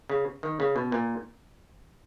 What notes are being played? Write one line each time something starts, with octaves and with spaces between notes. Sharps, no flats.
C#3
D#3
C#3
B2
A#2